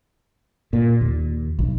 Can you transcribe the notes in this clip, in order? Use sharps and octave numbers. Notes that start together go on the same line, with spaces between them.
A#2
D#2
B1